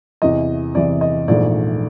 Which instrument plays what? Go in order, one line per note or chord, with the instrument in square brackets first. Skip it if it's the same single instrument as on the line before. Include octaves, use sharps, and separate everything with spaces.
[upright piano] E2 C3 E3 D#5
E2 C3 E3 D5
D#5
A#1 G#2 E3 A3 D5